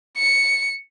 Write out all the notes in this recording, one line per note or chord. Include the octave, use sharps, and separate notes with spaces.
C#7